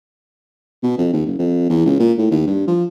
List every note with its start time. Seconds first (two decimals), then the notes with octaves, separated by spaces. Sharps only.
0.83 B2
0.98 F2
1.13 D#2
1.26 F#1
1.39 F2
1.70 E2
1.86 C#2
2.00 A#2
2.18 A2
2.31 D#2
2.47 G2
2.68 F3